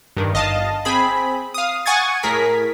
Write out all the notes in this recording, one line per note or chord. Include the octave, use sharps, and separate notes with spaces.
G2 D#3
G1 D#5 F5 A5
C4 G#4 B5
F5 D#6
F#5 G#5 C#6 D#6 G#6 A6
A2 G#4 A#4 B6